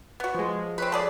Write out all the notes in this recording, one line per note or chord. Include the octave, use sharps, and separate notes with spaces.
B3 F#4
F3 G#3
C4 C#4 B4
A3 G#4 D5